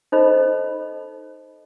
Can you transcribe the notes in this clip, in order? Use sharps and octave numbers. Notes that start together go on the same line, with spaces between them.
D#4 A4 C5 D#5 B5